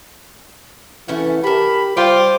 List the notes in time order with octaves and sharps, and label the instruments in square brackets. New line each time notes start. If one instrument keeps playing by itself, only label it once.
[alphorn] E3 [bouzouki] A3 C#4 F#5
[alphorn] G4 [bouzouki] A#4 A5 [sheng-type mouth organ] B5
[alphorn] G3 [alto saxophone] F4 [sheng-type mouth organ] C5 D6 [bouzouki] G5